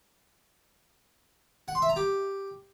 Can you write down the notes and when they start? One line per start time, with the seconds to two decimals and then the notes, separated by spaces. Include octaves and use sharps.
1.68 F#5
1.75 C6
1.82 E5
1.89 A#5
1.96 G4